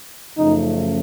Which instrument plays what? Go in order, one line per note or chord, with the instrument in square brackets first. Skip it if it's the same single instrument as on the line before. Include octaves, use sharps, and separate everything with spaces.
[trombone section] F#2 C#3 F3 A3 D#4